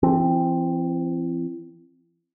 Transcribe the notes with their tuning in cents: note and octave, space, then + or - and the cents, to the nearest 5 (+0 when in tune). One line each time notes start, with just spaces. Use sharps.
E3 +40 C4 +0